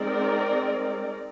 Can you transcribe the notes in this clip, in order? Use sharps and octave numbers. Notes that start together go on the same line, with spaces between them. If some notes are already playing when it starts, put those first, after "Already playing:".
Already playing: G#3 C4 D#4 A#4 D5